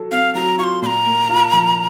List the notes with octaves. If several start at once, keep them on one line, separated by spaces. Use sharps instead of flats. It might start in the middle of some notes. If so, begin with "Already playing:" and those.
Already playing: F#3 A4
C4 F5
F#3 A#5
F4 C#6
C6
A#2 A#5 C6
A#3
F4
F3